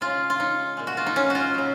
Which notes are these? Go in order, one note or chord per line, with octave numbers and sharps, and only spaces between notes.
C#3 G#3 F4
F4
D#4
A#2 G#3
F#4
F4
D#4
C#4
F4 F#4
C#3 F#3